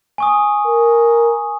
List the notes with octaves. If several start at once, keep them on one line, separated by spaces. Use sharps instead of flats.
G#5 C#6 D#6
A#4